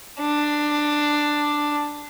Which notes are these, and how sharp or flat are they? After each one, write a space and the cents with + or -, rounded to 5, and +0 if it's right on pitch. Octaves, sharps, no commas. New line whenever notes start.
D4 +10